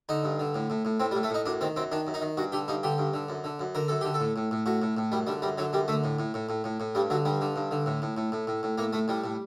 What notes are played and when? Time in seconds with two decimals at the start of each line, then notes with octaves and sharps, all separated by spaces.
0.09 D3 D#4
0.24 G2
0.39 D3
0.55 A2
0.70 A2
0.85 A2
1.00 A2 C4
1.11 G3
1.15 A2
1.23 A3
1.30 A2 D#4
1.46 F#2 D4
1.61 D#3 C4
1.76 F#2 C4
1.92 D#3 D4
2.07 F#2
2.14 D#4
2.22 D#3
2.37 G2 F#4
2.52 D3 G4
2.68 G2 D#4
2.83 D3 G4
2.98 G2
3.14 D3
3.29 F#2
3.44 D3
3.59 F#2
3.75 D3 A#4
3.88 F#2 A4
4.01 D3 G4
4.14 A4
4.20 A2
4.36 A2
4.51 A2
4.66 A2 F#4
4.82 A2
4.97 A2
5.12 F#2 G3
5.27 D3 G3
5.42 F#2 G3
5.58 D3 F#3
5.73 F#2 G3
5.88 D3 A3
6.04 A2
6.19 A2
6.34 A2
6.49 A2
6.64 A2
6.80 A2
6.95 G2 G3
7.10 D3 F#3
7.25 G2 G3
7.41 D3
7.56 G2
7.71 D3
7.86 A2
8.02 A2
8.17 A2
8.32 A2
8.47 A2
8.63 A2
8.78 A2 A#3
8.93 A2 A3
9.08 A2 G3
9.24 A2